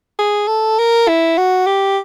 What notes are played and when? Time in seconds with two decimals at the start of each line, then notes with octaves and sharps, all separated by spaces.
0.19 G#4
0.48 A4
0.78 A#4
1.08 E4
1.38 F#4
1.67 G4